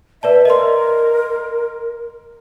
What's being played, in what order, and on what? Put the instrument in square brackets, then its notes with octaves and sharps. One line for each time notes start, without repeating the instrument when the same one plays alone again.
[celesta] B4 D5 A5 [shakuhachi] E5
[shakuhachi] A#4 [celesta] D#5 C6